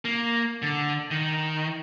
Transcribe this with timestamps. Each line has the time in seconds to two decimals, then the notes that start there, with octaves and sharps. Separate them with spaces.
0.05 A#3
0.62 D3
1.11 D#3